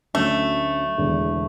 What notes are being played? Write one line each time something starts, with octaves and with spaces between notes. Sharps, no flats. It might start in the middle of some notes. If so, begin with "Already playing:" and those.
D2 D3 F#3 A3 C#4
E1 E2 D3